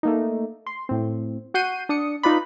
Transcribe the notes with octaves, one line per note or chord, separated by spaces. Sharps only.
A3 A#3 D#4
C6
A2 C4
F#4 F#5 G6 C7 D#7
D4 D#6 C#7
D#4 F4 B4 D5 B5